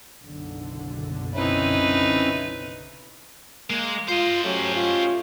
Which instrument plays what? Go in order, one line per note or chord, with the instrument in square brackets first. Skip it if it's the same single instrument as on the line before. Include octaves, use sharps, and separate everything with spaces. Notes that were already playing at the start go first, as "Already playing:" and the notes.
[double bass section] F#1 B1 D3
[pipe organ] C4 C#4 E4 [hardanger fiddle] D#4 B4
[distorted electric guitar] G#3 [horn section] A#3
[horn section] F4 [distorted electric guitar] C5 D#5
[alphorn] F#3 [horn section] A3 C#4 G4
[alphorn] F4